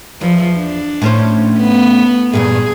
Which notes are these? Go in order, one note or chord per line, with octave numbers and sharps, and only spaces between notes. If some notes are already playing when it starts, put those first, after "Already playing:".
E2 F3
D4
A2 C#4 C5
B3
E2 G2 A#2 G#4